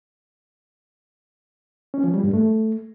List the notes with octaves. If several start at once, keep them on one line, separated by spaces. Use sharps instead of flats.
C#4
F3
G3
G2
A3